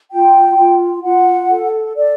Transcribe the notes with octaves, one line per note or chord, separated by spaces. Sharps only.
F4 G5
F4
F4 F#5
A4
A4 D5